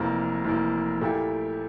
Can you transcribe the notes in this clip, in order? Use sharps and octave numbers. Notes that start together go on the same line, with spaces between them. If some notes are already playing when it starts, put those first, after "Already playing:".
Already playing: F1 F2 E3 A#3
F1 F2 E3 A#3
A#2 A3 E4 G4